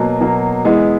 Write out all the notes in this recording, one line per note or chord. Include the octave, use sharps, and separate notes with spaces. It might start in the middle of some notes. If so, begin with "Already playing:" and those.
Already playing: B2 F#3 A#3
B2 F#3 A#3
E3 G#3 B3